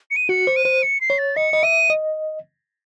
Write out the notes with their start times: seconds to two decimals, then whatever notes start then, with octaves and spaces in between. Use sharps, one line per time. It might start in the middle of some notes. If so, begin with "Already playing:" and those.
0.11 C#7
0.16 D#7
0.29 F#4 C#7
0.47 C5
0.56 D#7
0.65 C5
0.83 C#7
1.01 C7
1.10 C#5
1.18 A6
1.36 D#5 C#7
1.53 D#5
1.63 E5 D#7
1.90 D#5